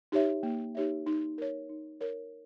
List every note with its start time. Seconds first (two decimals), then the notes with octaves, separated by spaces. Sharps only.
0.12 D#4 G4 C#5 E5
0.43 A#3
0.75 D#4 G4 C#5 E5
1.06 D#4
1.38 A#4 C#5
1.70 D#4
2.01 A#4 C#5